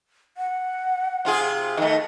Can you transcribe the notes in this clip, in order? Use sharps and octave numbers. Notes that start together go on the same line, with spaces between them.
F#5
C3 F4 G#4
D#3 A3 D#5